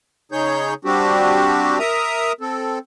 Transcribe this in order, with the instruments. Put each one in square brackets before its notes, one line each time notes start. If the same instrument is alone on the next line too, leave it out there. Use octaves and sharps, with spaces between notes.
[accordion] C#3 D#4 G#4 C#5 G6
G3 C4 D4 F#4 G4
A#4 E5 A#5 D#6
C4 A4